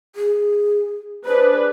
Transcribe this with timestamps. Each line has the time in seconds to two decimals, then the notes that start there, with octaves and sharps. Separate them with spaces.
0.16 G#4
1.25 D4 G#4 B4 C5